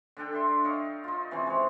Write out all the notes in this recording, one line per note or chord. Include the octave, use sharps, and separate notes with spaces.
D3 D4 A4 G5
G4 E5 C6
D#4 C#5 F5
D#4 F4
C3 E3 C4 C#4
G#3 C#5